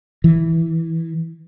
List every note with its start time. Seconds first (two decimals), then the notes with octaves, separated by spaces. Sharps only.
0.24 E3